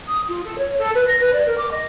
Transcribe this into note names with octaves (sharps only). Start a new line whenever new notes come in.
D#6
F4
A4
C#5
A4
B4
A#6
B4
D5
A#4
D6
D#5